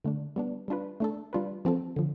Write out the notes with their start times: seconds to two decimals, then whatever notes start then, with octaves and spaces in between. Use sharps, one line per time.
0.04 D3 A3 D4
0.36 G3 B3 D4
0.68 G3 D4 F4 B4
1.00 A3 D4 A4
1.33 G3 D4 F4 B4
1.65 F3 C4 F4 A4
1.96 D3 F3